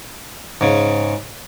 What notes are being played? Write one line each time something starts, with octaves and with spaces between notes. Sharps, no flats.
G#2 C#3